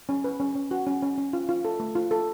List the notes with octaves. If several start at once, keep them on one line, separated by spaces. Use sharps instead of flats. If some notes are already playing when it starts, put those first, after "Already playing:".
C#4
B4
C#4
C#4
F#4
C#4
C#4
C#4
F4
F4
A4
A3
F4
A4